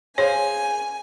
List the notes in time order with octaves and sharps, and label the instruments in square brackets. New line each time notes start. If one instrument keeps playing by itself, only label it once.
[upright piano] G#4 C5 F5 [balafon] C#5 [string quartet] G#5